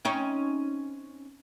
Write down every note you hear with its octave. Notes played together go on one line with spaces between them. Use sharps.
C4 C#4 D#4